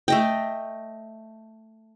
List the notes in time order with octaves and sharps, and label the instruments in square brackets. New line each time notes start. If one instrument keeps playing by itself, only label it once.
[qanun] A3 D#5 G5